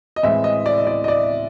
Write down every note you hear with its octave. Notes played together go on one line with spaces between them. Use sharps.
D#5
A2 E3 G#3 C4 E5
D#5
D5
D#5
D5
D#5
D5